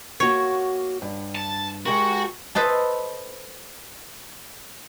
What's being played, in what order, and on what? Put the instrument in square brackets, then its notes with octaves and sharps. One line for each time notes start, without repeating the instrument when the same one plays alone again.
[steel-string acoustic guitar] A#3 F#4 [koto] C#5
[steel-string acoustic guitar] G2
[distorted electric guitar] A5
[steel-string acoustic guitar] G#3 G4 A#4 [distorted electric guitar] F#4
[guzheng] A4 B4 C5 D#5 A5